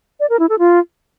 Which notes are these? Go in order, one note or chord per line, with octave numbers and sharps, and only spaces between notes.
D5
A#4
E4
A4
F4